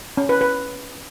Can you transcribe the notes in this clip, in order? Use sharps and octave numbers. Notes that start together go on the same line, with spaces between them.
C#4
B4
B4